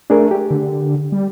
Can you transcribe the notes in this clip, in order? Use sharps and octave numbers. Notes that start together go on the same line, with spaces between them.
A3 D4 G#4 A#4
G4
D3
G3